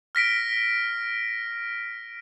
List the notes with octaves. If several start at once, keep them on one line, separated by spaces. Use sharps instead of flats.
F6 A#6 B6 D7